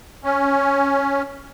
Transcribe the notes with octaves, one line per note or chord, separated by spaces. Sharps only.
C#4